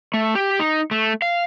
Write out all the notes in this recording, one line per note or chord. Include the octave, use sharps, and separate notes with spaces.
A3
G4
D#4
A3
F5